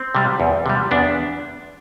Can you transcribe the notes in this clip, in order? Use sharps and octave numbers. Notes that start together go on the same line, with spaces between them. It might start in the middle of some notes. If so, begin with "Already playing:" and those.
Already playing: C4
C3 G3
E2
C3 G3
E2 B3 D4